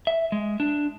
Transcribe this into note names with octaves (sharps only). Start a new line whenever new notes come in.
E5
G#3
D4